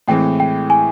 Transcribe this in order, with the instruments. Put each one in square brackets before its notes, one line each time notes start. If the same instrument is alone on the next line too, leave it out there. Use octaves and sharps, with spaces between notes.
[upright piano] A2 E3 G#3 C4 [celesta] G5
[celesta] G5
G#5